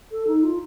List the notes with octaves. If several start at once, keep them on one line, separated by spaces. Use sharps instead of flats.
A4
D#4
F4